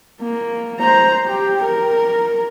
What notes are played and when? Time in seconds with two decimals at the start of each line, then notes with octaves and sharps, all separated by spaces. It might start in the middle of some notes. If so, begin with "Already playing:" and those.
0.21 A#3
0.80 C5 A#5
1.27 G4
1.63 A#4